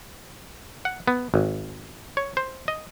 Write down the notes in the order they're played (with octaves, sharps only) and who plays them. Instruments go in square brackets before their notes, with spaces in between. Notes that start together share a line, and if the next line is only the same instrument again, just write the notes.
[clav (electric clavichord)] F#5
B3
G#1
C#5
C5
D#5